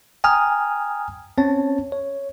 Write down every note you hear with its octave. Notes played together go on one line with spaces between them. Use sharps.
G5 G#5 A#5 D#6 F6
C4 C#4 C#5 A5
C#5